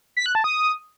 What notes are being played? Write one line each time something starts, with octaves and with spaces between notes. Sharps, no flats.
B6
F#6
A5
D#6